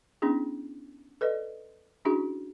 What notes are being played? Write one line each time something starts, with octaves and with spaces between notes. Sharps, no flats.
B3 C#4 D4 E4 G#4
A4 B4 D5 D#5
C#4 D4 E4 F#4 G#4